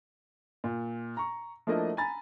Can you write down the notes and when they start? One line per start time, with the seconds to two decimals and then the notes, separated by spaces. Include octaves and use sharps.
0.64 A#2
1.17 A#5 C#6
1.67 F3 A3 A#3 D4 E4 D#5
1.97 G#5 A#5 B5 A6